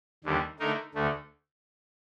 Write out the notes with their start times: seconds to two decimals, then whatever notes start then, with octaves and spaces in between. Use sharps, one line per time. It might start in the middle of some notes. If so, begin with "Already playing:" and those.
0.24 D#2 D3 G3
0.59 D3 A3 D#4 A#4
0.95 D2 D3 A3